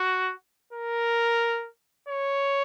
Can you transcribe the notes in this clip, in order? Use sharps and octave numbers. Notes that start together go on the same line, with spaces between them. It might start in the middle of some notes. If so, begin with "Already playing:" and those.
Already playing: F#4
A#4
C#5